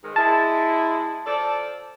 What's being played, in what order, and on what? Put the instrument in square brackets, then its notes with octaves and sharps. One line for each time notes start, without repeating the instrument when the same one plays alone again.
[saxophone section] G#2 D#3 G#3
[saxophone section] G#3 E4 [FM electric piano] A5
[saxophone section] F3 A4 D5